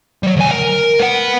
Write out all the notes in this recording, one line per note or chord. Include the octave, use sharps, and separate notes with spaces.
F#3 G3
D2 G#5
A#4
B3 F#5